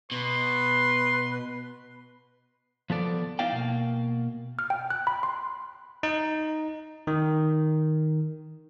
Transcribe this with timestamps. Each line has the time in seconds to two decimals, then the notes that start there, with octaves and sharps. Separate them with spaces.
0.12 B2 B4 C6
2.90 F3 B3 A4 D5
3.39 B3 D#4 E4 D5 F5 G5
3.52 B2 A#3
4.59 F6
4.70 G5
4.90 F#6
5.07 B5
5.23 C6
6.03 D#4
7.07 D#3